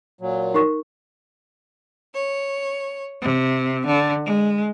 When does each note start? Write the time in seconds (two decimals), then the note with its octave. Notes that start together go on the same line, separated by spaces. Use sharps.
0.21 A#2 F#3
0.54 D#4 A#4 C#6
2.14 C#5
3.22 C3
3.86 D3
4.25 G#3